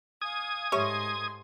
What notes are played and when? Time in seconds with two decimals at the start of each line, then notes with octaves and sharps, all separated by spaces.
0.22 F5 G#5 D#6 G#6
0.72 G#2 A3 G4 C#5 E5 C6 C#6